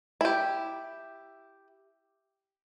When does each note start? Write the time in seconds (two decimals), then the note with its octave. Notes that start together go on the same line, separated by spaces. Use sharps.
0.21 E4 G4